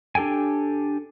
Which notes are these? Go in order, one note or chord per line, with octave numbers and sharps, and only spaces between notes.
D4 G4 A4 G5 G#5